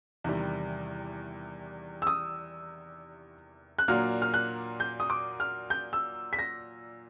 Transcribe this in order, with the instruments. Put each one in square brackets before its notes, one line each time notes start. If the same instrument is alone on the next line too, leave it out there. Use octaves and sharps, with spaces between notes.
[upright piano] E2 C3 D#3 G3
[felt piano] E6
D#6
F#6
[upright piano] A#2 F#3 A#3 D4 F#4 [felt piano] F6
[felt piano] F6
F#6
G6
D#6
D6
F6
G6
E6
B6
A#6